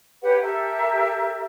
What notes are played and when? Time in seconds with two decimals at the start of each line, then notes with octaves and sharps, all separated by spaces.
0.22 G4 B4 C#5 F#5
0.42 G4 A4 A#4 E5